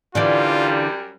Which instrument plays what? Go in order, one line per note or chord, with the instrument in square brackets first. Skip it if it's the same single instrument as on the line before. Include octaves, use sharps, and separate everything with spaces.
[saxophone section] F#2 G3 [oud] D3 E3 D5 [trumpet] F4